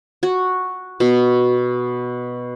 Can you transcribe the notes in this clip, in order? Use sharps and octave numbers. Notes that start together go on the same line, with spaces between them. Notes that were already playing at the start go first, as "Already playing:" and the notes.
F#4
B2